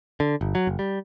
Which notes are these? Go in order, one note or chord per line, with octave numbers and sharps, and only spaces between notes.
D3
G1
F#3
F#1
G3